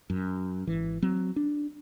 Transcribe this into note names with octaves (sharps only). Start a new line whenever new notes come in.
F#2
G#1 E3
F#3 C4
D4